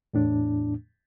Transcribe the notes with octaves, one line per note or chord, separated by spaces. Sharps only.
E2 A2 D4